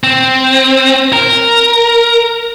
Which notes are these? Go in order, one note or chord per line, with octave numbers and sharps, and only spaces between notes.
C4
A#4